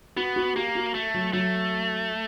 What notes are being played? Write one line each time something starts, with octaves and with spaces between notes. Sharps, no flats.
B3 F#4
F#4
A#3 G4
F#4
A3
F#3
F#3 A3